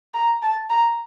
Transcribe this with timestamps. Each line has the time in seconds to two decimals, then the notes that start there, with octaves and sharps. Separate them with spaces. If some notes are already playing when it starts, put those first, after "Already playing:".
0.14 A#5
0.42 A5
0.70 A#5